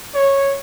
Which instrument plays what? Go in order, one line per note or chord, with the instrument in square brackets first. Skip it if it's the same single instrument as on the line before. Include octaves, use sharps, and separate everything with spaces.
[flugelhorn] C#5